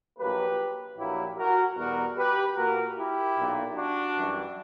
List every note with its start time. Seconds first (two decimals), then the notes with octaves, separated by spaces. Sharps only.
0.18 A#1 A#2 F#3 A#3 G4 B4
0.97 A#1 A#2 F#3 A#3 E4 G4
1.38 F#4 A#4
1.76 E2 B2 G3 B3 F#4 A#4
2.16 G4 B4
2.56 A#2 A#3 F#4 A#4
2.96 E4 G4
3.36 B1 A#2 A#3
3.75 D4 F#4
4.15 F#2 E3 G3